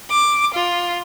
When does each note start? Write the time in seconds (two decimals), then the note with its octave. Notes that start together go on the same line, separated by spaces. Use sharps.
0.10 D6
0.54 F4